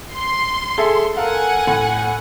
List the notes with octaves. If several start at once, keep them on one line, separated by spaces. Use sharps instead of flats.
C6
G#4 A4 E5
A4 A#4 F5 F#5 G#5
A2